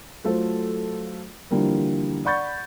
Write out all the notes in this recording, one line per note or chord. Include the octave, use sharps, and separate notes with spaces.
F#3 A3 F4 A4 C5
D3 E3 F3 G3 A#3
D5 F#5 B5 C#6 G6 A6